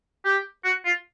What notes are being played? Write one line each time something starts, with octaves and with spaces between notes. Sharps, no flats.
G4
F#4
F4